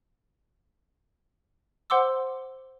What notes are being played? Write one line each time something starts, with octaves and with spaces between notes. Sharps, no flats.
C5 F#5 C6 D6 E6